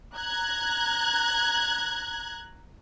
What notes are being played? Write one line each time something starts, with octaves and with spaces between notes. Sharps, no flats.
A#5 F#6 G#6